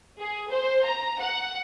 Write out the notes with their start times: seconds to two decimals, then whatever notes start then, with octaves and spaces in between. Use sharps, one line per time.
0.19 G#4
0.51 C5
0.85 A#5
1.20 F#5